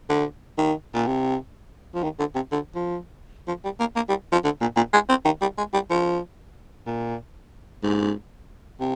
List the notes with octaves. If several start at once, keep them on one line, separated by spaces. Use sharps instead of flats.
D3
D#3
A#2
C3
F3
D#3
D3
C3
D3
F3
F3
G3
A#3
A#3
G3
F3
D3
A#2
A#2
G#3
C4
D#3
G3
G#3
G3
F3
A#2
G#2
C3